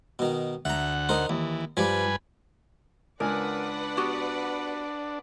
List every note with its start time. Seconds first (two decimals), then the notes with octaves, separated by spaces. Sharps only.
0.19 B2 D#3
0.65 D2 E5 F#5 A#5
1.09 D#4 A#4 C5
1.29 D#2 E3
1.77 G2 F3 G3 B4 D5 G#5
3.20 C#2 D4 A#4 B4 D5 F#5 G#5
3.97 B3 F#4 G4